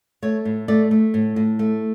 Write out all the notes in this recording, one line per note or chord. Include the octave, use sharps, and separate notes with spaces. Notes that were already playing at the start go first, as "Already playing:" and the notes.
A3 C#5
A2
A3 D5
A3
A2
A2
A3